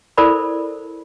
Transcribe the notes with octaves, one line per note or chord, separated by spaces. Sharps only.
E4 A4 A#4 C5 D5 B5